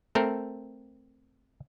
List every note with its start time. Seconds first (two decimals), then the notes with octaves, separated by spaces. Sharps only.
0.15 A3 C4 A4 A#4